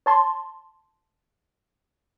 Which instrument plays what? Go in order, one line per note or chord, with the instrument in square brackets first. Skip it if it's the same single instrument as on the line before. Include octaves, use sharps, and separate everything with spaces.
[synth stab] C#5 A5 C6